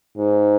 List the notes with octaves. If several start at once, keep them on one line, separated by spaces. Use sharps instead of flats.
G#2